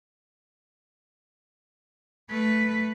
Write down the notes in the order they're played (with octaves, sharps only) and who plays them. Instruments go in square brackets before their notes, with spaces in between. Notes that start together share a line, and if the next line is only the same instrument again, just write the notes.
[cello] A3 B4